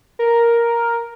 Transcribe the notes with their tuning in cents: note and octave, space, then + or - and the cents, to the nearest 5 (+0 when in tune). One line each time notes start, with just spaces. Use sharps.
A#4 +5